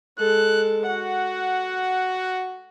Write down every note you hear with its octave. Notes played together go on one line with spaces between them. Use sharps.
G#3 A4 F#6
F#4 F#5